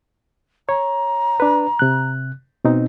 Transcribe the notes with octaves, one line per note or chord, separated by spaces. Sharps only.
C#5 A#5
D4 B4
C3 F#6
B2 C4 D#4